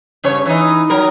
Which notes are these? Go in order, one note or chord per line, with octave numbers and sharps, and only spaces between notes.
G2 C#3 C#5
E3 D#4
F#3 A#4